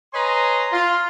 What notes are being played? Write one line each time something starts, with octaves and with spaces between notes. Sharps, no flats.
B4 C#5 D#5 G#5 A#5 C6
F4